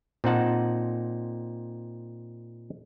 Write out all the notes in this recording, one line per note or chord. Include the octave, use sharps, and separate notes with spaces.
A#2 C4 D#4 F#5 A5